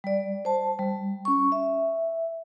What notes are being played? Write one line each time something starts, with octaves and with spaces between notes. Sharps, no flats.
G3 D5
C5 A5
G3
C#4 C#6
E5